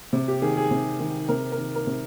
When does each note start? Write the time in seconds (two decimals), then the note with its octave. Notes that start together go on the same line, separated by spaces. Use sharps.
0.13 C3
0.28 G4
0.42 D#3 G#4
0.57 G#4
0.71 C3
1.00 D#3
1.29 C3 A#4
1.52 A#4
1.57 D#3
1.75 A#4
1.87 C3